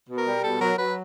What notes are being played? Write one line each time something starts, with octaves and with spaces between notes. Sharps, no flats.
B2
A#4
G3
B2 A4
F#3 A#4
F#3 B4